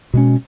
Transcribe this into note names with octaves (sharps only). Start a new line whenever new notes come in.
B2 G#3 C#4